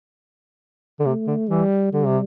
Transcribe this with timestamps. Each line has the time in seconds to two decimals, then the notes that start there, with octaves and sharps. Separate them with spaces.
1.00 D3
1.06 C3 A3
1.28 D3
1.49 E3 G3
1.93 D3 G3
2.05 C3